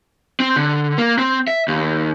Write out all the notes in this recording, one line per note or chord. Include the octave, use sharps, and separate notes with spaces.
C4
D3
A#3
C4
E5
D#2